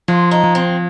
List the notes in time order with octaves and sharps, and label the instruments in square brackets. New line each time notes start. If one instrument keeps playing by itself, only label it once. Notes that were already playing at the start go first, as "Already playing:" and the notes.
[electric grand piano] F3 [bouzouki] F4
[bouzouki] D#4
[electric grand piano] F3
[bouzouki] C4